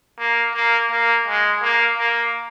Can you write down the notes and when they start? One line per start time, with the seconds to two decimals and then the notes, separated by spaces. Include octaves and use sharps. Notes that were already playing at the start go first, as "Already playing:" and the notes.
0.19 A#3
0.55 A#3
0.91 A#3
1.27 G#3
1.62 A#3
1.98 A#3